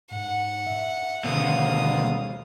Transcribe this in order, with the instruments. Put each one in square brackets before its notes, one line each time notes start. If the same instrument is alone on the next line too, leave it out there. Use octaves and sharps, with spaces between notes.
[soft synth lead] G#2 [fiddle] F#5
[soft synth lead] E5
[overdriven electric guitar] D2 B2 [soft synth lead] D#3 [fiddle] F5 D#6